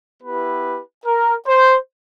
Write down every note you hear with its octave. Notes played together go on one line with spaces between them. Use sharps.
B3 E4 G4 B4
A#4
C5